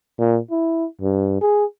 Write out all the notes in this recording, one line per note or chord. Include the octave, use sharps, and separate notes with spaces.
A#2
E4
G2
G#4